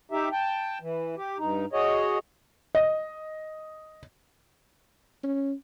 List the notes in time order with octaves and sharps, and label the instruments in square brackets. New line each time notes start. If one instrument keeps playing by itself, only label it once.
[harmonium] D#4 G4 E5
G5 A5
E3
G4
G2 D#4
F#4 G#4 C#5 D#5
[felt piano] D#5
[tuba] C#4